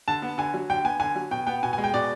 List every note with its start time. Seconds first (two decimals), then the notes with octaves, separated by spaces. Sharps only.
0.08 D3 A5
0.22 B3
0.38 D3 G#5
0.54 F#3
0.70 D3 G5
0.85 B3 G#5
1.00 D3 G#5
1.16 F#3
1.31 B2 G5
1.47 B3 G5
1.63 B2 G#5
1.73 G#5
1.78 G#3
1.84 G5
1.94 B2 D5